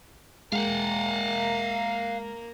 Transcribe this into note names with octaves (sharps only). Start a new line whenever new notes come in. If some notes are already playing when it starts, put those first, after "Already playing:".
G#3 A#3 A#4 F5 F#5